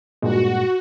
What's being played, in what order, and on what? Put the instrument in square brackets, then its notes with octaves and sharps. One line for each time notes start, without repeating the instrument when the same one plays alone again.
[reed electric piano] G2 A#2 G#3 [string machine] F#4